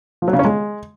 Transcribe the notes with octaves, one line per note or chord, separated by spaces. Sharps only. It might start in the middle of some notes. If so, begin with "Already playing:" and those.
F3
F#3
C#3
C#4
G#3